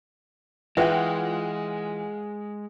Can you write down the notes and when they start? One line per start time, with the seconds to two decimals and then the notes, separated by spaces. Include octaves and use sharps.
0.77 E3 G#3 F4 B4 E5 F#5 G5